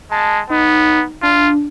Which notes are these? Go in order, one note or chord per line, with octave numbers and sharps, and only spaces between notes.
G#3 A5
B3 D#4
D4 F4